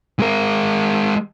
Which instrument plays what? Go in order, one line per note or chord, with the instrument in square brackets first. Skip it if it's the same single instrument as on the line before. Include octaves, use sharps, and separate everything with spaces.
[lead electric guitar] G#3 A#4